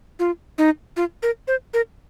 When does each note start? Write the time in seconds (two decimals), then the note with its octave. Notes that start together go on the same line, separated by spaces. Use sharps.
0.19 F4
0.58 D#4
0.97 F4
1.23 A#4
1.48 C5
1.74 A#4